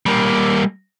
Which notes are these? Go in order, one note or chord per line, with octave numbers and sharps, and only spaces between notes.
G3 A#3